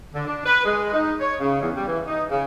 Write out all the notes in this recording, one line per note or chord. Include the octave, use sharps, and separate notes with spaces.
D3
D4
B4
G#3
D#4
C#5
C#3
E2
G3
E3
D#4
C#3